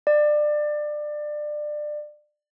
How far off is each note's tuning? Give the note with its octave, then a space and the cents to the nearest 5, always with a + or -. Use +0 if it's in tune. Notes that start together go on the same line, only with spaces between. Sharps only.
D5 +25